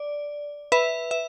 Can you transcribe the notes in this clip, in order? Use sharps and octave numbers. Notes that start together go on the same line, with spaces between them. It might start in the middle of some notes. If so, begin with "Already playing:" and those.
Already playing: D5
B4 E5
E5